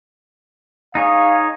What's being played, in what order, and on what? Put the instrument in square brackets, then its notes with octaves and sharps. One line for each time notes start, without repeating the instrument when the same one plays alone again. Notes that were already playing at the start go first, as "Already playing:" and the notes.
[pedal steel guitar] D#4 G#4 C#5 [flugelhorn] F5